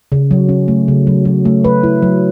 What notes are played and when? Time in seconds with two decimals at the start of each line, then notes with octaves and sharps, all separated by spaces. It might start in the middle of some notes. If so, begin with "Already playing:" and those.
0.12 C#3
0.31 F#3
0.49 C#4
0.68 A3
0.88 C#3
1.07 F#3
1.25 F#3
1.45 A3
1.64 B4
1.83 E4
2.02 F#3